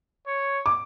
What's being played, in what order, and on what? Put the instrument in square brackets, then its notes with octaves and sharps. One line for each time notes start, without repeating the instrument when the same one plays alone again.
[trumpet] C#5
[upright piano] D6